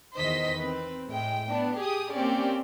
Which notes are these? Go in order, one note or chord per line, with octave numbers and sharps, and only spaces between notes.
E2 D#3 C5 D#5 B6
C4 B4
A2 G#3 G5
B3 D4
G4 G#4 D#6
A#3 C4 C#4 G4 D5